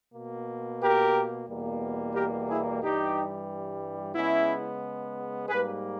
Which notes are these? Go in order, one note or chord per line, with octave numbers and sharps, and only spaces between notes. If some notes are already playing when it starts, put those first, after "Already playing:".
B2 A#3
G4 A#4
E2 B2 G3 A#3
G4 A#4
E4 G#4
G2 E3 G3 D#4 G4
C#3 G#3 B3 C#4 E4
G#2 G3 A#3 G#4 B4